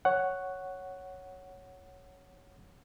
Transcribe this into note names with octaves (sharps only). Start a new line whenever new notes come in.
C#5 F#5